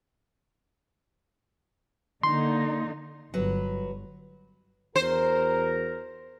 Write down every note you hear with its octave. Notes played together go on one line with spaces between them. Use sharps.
D3 A#3 D#4 C6
G1 F#3 B4
E2 F#4 A#4 C5